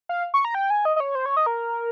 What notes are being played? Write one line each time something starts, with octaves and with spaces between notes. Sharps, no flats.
F5
C#6
A#5
G5
G#5
D#5
D#5
C#5
C5
C#5
D#5
A#4